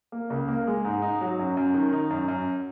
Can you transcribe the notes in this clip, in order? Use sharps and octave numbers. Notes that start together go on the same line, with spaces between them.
A#3
C#2
A#3
G#3
G#2
D#4
F#3
F#2
F#2
D#3
D#4
F#2
F#2